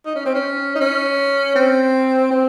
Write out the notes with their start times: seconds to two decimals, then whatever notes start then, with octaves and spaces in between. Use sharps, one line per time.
0.06 D#4
0.16 C#4
0.25 C4
0.35 C#4
0.76 D#4
0.81 C#4
1.56 C4
2.31 C4